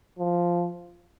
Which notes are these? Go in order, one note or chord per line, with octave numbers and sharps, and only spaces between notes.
F3